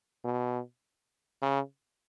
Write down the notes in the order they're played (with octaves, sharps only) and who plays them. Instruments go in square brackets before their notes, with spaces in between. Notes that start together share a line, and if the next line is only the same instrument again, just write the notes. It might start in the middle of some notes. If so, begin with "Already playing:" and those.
[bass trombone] B2
C#3